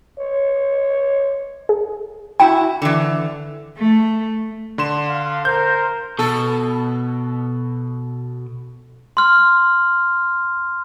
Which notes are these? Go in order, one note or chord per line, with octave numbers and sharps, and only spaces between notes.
C#5
G#4
E4 F#4 G5 B5
D3 E3
A3
D3 C6 E7
F5
A#4 C5 G6
B2 A4
C6 F6